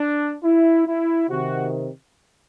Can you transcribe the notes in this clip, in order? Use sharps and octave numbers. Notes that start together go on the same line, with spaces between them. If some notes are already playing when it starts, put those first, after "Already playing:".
Already playing: D4
E4
E4
C3 D#3 F#4